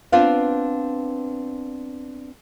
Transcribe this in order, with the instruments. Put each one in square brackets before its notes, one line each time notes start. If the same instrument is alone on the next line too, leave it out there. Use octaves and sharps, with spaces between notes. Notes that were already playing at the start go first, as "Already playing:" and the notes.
[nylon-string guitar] B3 C4 D4 F4 B4 F5